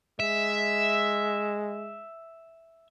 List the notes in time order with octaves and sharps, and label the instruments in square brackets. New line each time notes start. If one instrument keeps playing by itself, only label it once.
[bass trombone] G#3 [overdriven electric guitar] E5